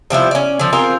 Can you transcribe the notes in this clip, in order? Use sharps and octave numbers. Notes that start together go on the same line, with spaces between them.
C3 F3 G3 E4
C#4 D5
D3 F3
C4 F4 G#4 A#4